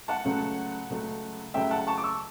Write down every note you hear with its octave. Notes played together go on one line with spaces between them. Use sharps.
F#5 A5
C#2 C#3 F#3 A3
C#2 C#3 F#3 A3
C#2 C#3 F#3 A3 E5 G5
F#5 A5
A5 C#6
D6
C#6 E6